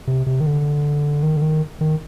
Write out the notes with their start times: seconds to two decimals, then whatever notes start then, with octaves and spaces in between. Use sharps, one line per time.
0.07 C3
0.26 C3
0.40 D#3
0.46 D3
1.23 D#3
1.37 D3
1.42 D#3
1.81 D#3